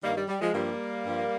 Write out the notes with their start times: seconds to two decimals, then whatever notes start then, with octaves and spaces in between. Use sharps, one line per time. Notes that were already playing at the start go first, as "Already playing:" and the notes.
0.03 G2 D#3 G3 A#3
0.16 G3
0.28 G3
0.41 F3 G#3
0.53 G2 F3 G3 A#3
1.04 G2 F3